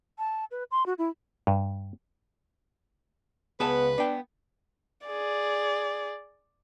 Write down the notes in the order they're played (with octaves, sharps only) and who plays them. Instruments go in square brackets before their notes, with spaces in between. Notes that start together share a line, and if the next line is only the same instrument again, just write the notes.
[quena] A5
B4
C6
F#4
E4
[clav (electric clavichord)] G2
[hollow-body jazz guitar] C#2 G#4 A5 [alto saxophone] B3 [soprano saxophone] B4
[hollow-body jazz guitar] B3 G5 [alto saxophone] D4
[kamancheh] G#4 D5